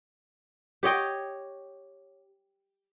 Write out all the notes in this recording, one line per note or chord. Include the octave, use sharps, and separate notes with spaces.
G4 C#5 D#5 G5